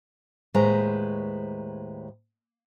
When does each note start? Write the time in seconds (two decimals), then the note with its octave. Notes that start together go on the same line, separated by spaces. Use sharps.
0.54 D#2 A2 G#3 B4 C5 A#5